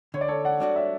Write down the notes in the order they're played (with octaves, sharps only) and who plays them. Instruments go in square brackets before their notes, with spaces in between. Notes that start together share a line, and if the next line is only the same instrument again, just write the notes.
[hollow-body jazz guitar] D3 [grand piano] C#5
[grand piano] D5
A4 C#5
D5 F#5
[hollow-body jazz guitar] G3 D4 F#4
[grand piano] C#5 E5